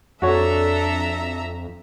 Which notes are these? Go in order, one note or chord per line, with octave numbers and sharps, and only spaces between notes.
F2 D4 F#4 A4 C#5 E5 A#5